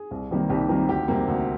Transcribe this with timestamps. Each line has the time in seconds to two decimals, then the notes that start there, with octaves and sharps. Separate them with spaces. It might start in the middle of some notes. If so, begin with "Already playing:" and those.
Already playing: G#4
0.11 C2
0.31 C3 D#3 G3 A#3
0.50 C2 G4
0.69 C3 D#3 G3 A#3 A#4
0.89 D2 G4
1.08 C3 G3 A#3
1.28 D2